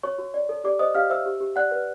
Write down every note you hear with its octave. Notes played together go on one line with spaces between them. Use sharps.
F#4 C#5 C#6
F#4
D5
A4
G4 D5 D6
C5 D#5 D#6
G4 F5 F6
C5 E5 E6
G4
G4
D5 F#5 F#6
B4